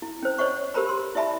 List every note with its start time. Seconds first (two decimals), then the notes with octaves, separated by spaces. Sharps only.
0.02 E4
0.23 C#4 C5
0.38 C5 C#5 D#5 F#5 C#6
0.74 G4 A#4 C5 A#5 B5
0.89 C6
1.15 E4 D5 E5 A5 B5